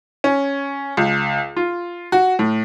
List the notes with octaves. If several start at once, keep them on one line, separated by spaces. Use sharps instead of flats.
C#4
C#2
F4
F#4
A2